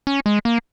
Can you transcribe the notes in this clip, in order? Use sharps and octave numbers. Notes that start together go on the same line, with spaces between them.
C#4
G#3
A#3